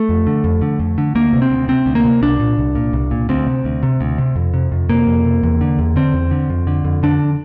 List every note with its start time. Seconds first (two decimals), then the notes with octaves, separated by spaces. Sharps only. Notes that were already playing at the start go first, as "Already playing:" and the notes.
Already playing: A3
0.09 F2
0.27 D3
0.44 F2
0.62 D3
0.80 F2
0.98 D3
1.15 D2 A#3
1.33 C3
1.42 C4
1.50 D2
1.68 C3 C4
1.86 D2
1.95 A#3
2.05 C3
2.22 C2 D4
2.40 A#2
2.58 C2
2.75 A#2
2.93 C2
3.11 A#2
3.29 D2 C4
3.47 C3
3.65 D2
3.83 C3
4.01 D2
4.18 C3
4.36 F2
4.54 C3
4.72 F2
4.89 C3 A#3
5.07 F2
5.25 C3
5.43 E2
5.61 D3
5.79 E2
5.96 D3 C4
6.14 E2
6.31 D3
6.50 F2
6.67 D3
6.85 F2
7.03 D3 D4